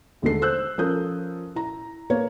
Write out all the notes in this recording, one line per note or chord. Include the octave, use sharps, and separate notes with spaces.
D#2 D3 G#3 A3 A4 C7
C5 E6 F#6 G6
F3 C#4 A4 A#4 D#6 G6
E4 A#5
A#3 B4 C#5